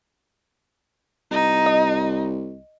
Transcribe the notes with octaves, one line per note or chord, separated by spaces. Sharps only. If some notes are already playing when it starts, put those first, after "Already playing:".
C2 D#4
D#5